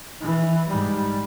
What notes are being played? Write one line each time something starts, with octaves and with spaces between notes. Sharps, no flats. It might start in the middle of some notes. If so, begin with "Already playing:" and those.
E3
G#2 G3